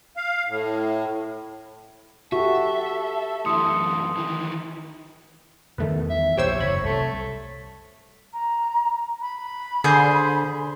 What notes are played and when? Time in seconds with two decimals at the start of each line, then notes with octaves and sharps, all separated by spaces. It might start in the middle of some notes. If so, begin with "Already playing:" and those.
0.17 F5
0.48 A2
2.32 F#4 G4 A4 E5 C#6
3.46 F#2 E3 A3 C6 D#6 C#7
4.17 D#3 E3
5.78 E2 D#3 G3 A3 B3
6.10 E5
6.37 A#1 E2 G4 C5 C#5 E6
6.60 F#1 A2 C#5 B5
6.83 C2 A3
8.33 A#5
9.21 B5
9.84 D3 G#4 C5